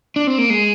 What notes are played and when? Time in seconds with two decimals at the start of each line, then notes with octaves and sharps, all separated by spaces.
0.16 D4
0.27 C4
0.38 A#3
0.50 G#3